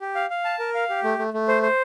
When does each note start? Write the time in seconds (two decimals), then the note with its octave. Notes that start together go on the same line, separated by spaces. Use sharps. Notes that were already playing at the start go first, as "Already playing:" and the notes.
0.01 G4
0.15 F5
0.30 F5
0.45 A5
0.59 A#4
0.74 F5
0.89 G4
1.03 A3
1.19 A3
1.34 A3
1.48 C5
1.63 C5